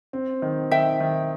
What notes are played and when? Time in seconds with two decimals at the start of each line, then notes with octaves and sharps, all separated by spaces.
0.13 C4
0.42 D#3
0.71 D#3 E5 G5
1.00 D#3